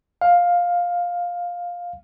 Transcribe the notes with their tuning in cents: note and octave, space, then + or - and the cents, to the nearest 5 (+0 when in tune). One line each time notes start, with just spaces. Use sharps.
F5 +10